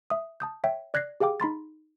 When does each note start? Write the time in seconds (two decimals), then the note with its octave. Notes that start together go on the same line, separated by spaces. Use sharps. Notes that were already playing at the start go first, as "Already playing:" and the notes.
0.10 E5 D#6
0.40 A5 D#6 G6
0.64 C#5 E5 G5
0.94 D5 F#6 G#6 A#6 C7
1.20 G4 G#4 F5 G5 D6
1.40 D#4 B5 C6 A6